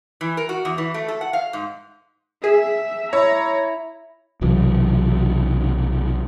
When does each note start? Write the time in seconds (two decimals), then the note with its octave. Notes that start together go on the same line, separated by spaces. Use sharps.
0.21 E3
0.37 A#4
0.49 F#4
0.65 E2
0.78 E3
0.94 A3
1.08 A4
1.21 F#5
1.33 F5
1.53 G#2
2.44 G#4 E5
3.13 E4 C#5 A#5
4.41 B1 C3 E3 F#3